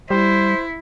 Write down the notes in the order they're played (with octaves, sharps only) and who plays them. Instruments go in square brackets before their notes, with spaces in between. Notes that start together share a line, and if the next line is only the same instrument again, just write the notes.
[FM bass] G3 [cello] E4 [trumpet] C5